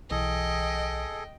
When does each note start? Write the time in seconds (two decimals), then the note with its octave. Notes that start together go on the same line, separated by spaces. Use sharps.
0.11 B1 E3 G#4 A4 D#5 G5